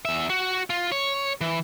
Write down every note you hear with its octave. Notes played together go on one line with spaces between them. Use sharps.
E2 E5
F#4
F4
C#5
E3